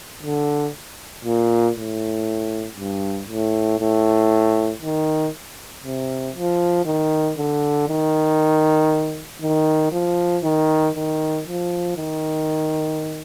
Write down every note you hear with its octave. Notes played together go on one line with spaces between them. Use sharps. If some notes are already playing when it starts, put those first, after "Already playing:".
D3
A#2
A2
G2
A2
A2
D#3
C3
F3
D#3
D3
D#3
D#3
F3
D#3
D#3
F3
D#3